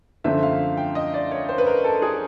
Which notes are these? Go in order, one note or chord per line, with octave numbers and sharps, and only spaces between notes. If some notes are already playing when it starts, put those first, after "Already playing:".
F#2 D3 F3 A3 C4 E5
F5
G5
D#5
D5
C#5
C5
B4
A#4
A4
G#4